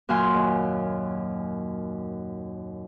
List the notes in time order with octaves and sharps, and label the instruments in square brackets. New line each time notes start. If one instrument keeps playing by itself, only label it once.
[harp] F#2 A#2 F#3 F5 G#5 C6
D#2